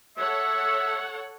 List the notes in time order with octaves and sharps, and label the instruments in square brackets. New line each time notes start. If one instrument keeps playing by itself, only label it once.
[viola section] A4 C#5 F#5 [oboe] E5